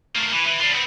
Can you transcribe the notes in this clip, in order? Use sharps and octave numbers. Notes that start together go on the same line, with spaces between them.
A3 A#3
E3
E3
G3 F4
B3 C4